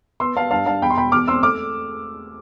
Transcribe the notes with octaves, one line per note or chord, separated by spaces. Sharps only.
B3 C6 E6
B3 F5 A5
G2 F5 A5
G2 F5 A5
E2 G5 B5
C6
E1 G5 B5
E2 D6 F6
C4 C6 E6
A3 D6 F6